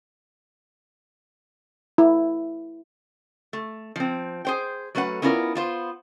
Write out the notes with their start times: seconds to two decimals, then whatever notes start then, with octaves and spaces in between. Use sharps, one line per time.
1.98 E4
3.53 A3
3.96 F3 C4
4.45 G#4 C5 G5
4.95 F#3 A3 C#4 B4 F#5
5.22 B3 C#4 E4 F4 A#4 D5
5.55 B3 F4 C5